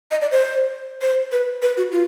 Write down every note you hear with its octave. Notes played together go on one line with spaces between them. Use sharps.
D#5
D5
C5
C5
B4
B4
F#4
F4